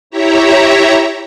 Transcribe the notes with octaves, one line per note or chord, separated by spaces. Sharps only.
E4 G4 C#5 E5 A#5